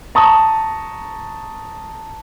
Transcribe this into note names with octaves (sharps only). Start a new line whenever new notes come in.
A5 A#5 C#6 D#6